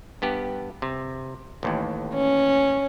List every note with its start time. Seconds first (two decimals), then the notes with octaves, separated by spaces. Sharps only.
0.22 G2 B3 G4
0.82 C3
1.63 A1 D#2 A2
2.13 C#4